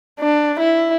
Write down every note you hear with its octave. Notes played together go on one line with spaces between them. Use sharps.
D4
E4